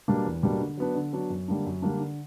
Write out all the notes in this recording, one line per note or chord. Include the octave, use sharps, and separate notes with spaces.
B2 G3 A#3 D4
E2
B2 G3 A#3 D4
D3
F#3 B3 D4
D3
F#3 B3 D4
F#2
D3 G3 A#3 D4
F#2
D3 G3 A#3 D4
D3